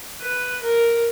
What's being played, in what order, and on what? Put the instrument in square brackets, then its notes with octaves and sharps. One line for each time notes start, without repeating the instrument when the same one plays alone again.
[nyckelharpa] B4
A#4